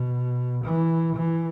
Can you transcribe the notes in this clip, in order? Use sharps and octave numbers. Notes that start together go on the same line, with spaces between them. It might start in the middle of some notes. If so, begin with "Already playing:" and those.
Already playing: B2
E3
E3